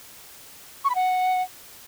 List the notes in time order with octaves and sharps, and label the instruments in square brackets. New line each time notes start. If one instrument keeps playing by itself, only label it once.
[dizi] C#6
B5
F#5